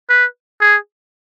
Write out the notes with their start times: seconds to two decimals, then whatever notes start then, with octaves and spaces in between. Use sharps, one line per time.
0.09 B4
0.61 G#4